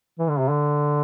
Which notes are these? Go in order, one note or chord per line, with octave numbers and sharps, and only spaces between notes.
E3
D3
C3
D3